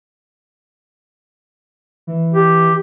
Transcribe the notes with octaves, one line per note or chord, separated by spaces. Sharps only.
E3
G4